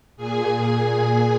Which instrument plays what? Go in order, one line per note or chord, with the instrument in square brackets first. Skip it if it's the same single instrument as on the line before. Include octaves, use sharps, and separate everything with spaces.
[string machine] A#2 G#4 G#5